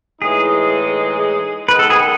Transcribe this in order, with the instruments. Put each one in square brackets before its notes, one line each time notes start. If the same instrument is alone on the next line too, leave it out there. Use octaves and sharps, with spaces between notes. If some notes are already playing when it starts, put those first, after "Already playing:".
[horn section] A2 E3 G#3 D#4 [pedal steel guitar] G#4
[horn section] D#3 G#3 B3 [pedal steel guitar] B4
[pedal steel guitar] A4
G#4
A4